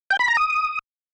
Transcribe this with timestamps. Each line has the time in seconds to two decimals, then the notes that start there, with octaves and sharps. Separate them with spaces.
0.10 G5
0.19 B5
0.28 A#5
0.37 D#6